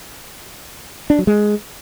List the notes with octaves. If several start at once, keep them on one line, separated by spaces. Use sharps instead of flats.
D4
F#3
G#3